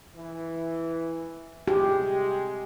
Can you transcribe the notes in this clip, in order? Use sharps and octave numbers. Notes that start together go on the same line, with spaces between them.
E3
C3 G#3 G4